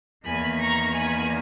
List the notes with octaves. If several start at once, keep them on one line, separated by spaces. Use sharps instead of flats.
E2 D#3 A#3 G#5 B5
A#5 C#6
G#5 B5